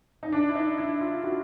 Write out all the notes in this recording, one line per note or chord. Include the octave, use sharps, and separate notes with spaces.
D#4
D4
E4
D#4
E4
F4
F#4